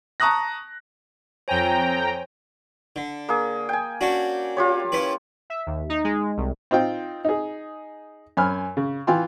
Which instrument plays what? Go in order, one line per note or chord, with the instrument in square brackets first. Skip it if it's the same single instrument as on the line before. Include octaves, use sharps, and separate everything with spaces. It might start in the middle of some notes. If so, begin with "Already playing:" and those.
[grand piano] A5 A#5 C#6 D#6 F#6 A#6
[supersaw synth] F2 G5 A#5 [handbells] C5 C#5 G#5
[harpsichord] D3
[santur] A#3 G#4
G5 G#5
[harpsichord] C#4 D4 F#4
[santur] F4 G4 C#5
[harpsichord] C#4 E4 B4
[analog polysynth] E5
D#2
D#4
G#3
C2
[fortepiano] C4 D#4 F4 G5
D#4 G#4
F#2 G#5 B5 F6
C#3
E3 F4 G5 G#5 C6